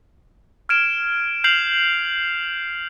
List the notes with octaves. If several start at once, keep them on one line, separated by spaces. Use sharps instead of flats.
F6 G#6 D7 E7
F6 G6 C7 F7 F#7